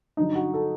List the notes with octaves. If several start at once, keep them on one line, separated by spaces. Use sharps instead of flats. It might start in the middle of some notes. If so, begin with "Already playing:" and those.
G2 D3 F#3 D#4
F#4
A4